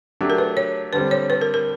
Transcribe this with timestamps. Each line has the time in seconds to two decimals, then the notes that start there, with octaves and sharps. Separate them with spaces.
0.21 F#3 A3 D4 G4
0.30 A#4
0.38 B4
0.57 C#5
0.93 D3 G3 C4 B4
1.11 C#5
1.30 B4
1.41 A#4
1.54 A#4